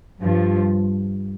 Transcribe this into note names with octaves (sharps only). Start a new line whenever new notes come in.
G2 F3